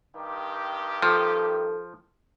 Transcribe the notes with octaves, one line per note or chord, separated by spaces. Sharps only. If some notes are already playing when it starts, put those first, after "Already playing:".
G2 D#3 G4
F3 A4